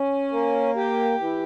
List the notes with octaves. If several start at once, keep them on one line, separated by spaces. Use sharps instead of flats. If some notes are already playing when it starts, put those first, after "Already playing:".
Already playing: C#4
A#3
G4
E3